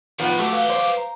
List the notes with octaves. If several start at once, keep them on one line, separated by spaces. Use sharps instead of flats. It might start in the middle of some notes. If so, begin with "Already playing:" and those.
A2 D#3 F3 B3
F#3 A3 F#4 G4
B4 F5
C5
A#5